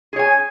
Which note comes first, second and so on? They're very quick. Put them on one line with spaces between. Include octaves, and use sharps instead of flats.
G#4 C#5 G#5